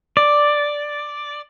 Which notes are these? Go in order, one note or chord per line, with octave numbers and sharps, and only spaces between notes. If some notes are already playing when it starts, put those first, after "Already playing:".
D5